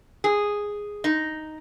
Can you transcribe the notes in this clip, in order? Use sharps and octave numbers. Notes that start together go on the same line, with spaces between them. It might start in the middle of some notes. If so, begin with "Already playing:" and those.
G#4
D#4